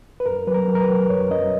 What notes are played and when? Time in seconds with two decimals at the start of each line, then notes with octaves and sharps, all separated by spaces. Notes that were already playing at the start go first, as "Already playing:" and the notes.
0.20 B4
0.26 F#2 A#4
0.47 F#3 B4
0.54 A#4
0.68 F#3
0.75 A#4
0.82 B4
0.88 F#3
1.10 F#2 C#5
1.31 F#2 D#5